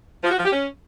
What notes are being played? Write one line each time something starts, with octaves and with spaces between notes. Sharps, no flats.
F3
F#4
F3
G4
C#4